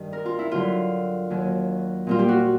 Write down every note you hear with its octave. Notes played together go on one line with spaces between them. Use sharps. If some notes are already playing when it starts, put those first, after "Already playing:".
Already playing: G2 D#3
A#4
F4
E4
G2 D3 F#3 F4
D#2 D#3 F#3
A#2 G3 A#3 F4
G4
F#4